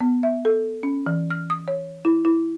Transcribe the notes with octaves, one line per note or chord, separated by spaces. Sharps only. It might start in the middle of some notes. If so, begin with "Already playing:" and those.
B3
E5
A4
C#4
E3
F6
D#6
C#5
E4
E4